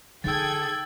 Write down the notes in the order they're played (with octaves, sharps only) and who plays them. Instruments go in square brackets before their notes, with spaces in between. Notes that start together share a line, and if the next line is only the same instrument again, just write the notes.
[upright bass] D3 D#4 [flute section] G#4 A4 [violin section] G5 G#6 [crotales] E6 A6